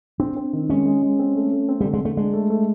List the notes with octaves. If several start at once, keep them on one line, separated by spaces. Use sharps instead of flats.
C4 D4
C4
D#3
G#3 C#4
G#3
G#3
C4
A3
A3
C4
D3 G3
G#3
D3 A3
G#3 D4
A3
A3